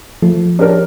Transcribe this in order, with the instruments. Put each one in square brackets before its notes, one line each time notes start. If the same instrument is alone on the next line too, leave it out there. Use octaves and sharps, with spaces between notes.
[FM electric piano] F3 [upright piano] A3
[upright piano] D4 G4 A#4 C#5